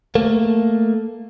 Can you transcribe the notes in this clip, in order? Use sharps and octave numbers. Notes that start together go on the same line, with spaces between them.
A3 A#3